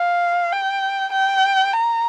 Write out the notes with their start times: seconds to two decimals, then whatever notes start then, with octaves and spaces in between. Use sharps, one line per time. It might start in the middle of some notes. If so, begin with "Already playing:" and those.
Already playing: F5
0.53 G5
1.12 G5
1.74 A#5